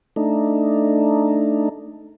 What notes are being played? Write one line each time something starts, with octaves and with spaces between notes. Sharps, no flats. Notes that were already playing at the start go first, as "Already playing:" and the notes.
A3 D4 D#4